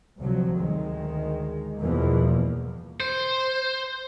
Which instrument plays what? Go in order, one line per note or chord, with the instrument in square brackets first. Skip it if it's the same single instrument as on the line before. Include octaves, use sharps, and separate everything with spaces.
[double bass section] D2 C3 F3 F#3
D2 D#3 G#3
E2 G2 B2 E3 F3 A#3
[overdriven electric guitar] C5